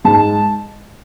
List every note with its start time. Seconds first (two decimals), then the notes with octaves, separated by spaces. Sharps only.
0.05 G#2 A5